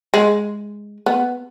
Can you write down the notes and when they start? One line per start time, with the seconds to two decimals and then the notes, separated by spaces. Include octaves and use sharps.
0.14 G#3
1.06 B3